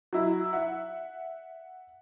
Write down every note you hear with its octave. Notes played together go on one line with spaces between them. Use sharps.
F#3 E4
E5 F#5